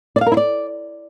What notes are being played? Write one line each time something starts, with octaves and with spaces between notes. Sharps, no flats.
D5
F5
A#4
E4
D5